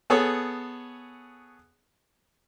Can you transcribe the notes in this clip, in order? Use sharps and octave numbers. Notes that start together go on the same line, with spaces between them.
B3 G#4 A4 C#5